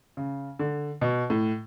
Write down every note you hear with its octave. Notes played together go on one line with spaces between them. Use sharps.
C#3
D3
B2
A2